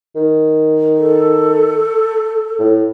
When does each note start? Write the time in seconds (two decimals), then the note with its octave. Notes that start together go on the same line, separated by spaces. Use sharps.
0.16 D#3
0.97 A4
2.59 A2